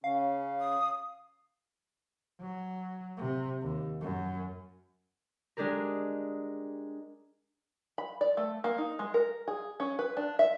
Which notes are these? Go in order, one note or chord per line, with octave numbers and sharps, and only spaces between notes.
C#3 C#4 F5
D#6
F#3
C3
D#2
F#2
G#3 D4 G4 G#4 A#4
B5
D5
A3
A#3
D#4
G#3
A#4
G#4
C#4
B4
D4
E5